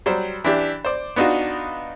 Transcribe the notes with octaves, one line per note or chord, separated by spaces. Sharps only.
F#3 G3 C5
E3 D4 G4
C5 D5
B3 D4 D#4 F4 F#4